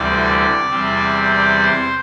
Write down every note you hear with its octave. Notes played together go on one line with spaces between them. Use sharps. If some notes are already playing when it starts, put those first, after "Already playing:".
Already playing: D2 C3 E3 G3 D5
E2 C3 G3 C4
D5
C5